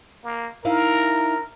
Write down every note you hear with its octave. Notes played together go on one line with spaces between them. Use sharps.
A#3
D#4 E4 A#4 F5